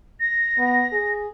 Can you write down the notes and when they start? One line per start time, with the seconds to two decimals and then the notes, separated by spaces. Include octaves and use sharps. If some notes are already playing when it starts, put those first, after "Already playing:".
0.20 A#6
0.58 B3
0.92 G#4